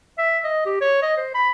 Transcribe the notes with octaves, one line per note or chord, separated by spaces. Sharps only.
E5
D#5
G4
C#5
D#5
C5
B5